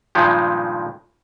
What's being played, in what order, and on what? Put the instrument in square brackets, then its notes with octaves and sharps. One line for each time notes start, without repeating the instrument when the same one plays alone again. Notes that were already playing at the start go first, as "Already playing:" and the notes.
[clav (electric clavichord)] G2 A#2 D#3 F3 G#3